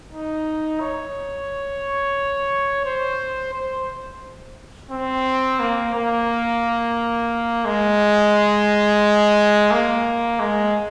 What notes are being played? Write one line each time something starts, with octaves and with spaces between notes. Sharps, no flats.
D#4
C#5
C5
C5
C4
A#3
A#3
G#3
A#3
G#3